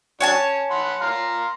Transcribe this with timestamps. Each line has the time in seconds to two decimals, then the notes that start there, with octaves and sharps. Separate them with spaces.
0.21 F#3 D4 C#5 G#5 A5
0.32 C#4
0.71 F#5 B5 C6
1.01 F5 A#5 C6